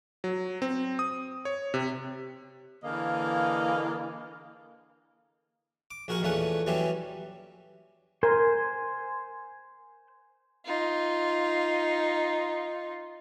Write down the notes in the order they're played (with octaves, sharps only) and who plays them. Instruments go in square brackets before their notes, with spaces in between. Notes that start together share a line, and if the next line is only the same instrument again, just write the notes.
[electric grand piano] F#3
C4
D#6
C#5
C3
[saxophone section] D3 E3 A#3 G#4 D#5 F5
[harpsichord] D6
A#1 F#4 G#4 A#4 G#5 C#6
E2 A#2 A3 C#4 G#4 F#5
E3 F#3 G3 C#4 E4 G4
[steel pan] A#4 [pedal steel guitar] C5 G#5 C6
[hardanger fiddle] D#4 F4